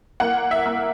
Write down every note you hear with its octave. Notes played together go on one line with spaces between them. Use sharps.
A#3 F#5
E5
A#3